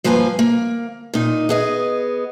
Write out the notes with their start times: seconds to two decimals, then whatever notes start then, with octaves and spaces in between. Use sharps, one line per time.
0.04 G2 F3 A#3 B4 C5 G#5
0.39 A#3
1.14 A#2 D#4
1.49 B3 G#4 D#5